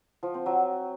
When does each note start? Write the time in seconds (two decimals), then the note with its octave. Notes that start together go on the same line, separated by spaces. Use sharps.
0.23 F3
0.34 C4
0.46 F#3